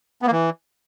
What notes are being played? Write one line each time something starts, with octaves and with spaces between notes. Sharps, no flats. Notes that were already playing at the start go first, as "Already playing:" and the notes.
B3
A#3
E3